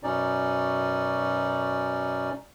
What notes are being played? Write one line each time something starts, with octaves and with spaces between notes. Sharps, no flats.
F#2 B2 C#4 D#4 D5